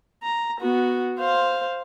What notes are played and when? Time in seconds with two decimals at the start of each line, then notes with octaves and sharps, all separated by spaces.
0.23 A#5
0.61 B3 F#4
1.19 C5 F5